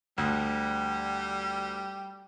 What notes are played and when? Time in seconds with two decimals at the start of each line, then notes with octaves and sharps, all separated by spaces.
0.18 D2 G3